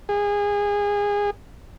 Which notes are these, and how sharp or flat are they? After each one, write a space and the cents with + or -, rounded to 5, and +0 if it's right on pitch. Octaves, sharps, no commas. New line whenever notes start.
G#4 -25